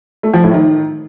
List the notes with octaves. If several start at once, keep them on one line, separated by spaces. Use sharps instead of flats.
A3
F3
A2
D#3